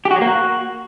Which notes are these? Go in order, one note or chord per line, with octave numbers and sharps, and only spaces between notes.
G4
F#4
F#3
A#3
F#4